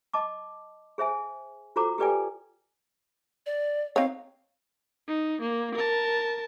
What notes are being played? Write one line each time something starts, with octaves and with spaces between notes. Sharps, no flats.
D#5 A5 D6
G#4 C5 E5 G#5
F4 F#4 A4 C5 A#5 D6
G4 A4 B4 D5 G5 G#5
D5
C4 D#4 C#5 F5
D#4
A#3
A#4 A5